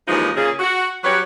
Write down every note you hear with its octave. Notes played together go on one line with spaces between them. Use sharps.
D#2 C#3 E3 F3 G#3 D#4
A#2 C#3 G#4
F#4
F#3 G3 F#4 G4 B4 C#5